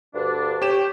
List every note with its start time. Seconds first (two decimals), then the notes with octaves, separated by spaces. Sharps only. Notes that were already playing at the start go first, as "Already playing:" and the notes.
0.13 D2 G2 D4
0.62 G4 C#5 G5 E7